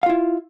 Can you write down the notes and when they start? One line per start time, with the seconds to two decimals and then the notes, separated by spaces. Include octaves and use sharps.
0.03 F5
0.06 F4
0.09 E4